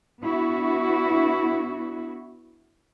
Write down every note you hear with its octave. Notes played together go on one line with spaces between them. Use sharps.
B3 D4 E4 F#4